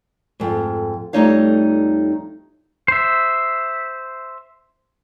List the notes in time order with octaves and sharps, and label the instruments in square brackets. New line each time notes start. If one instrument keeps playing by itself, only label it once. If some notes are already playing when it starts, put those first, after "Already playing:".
[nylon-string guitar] F2 G#2
F2 G3 A3 D#4 C#5 F5
[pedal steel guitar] C5 E5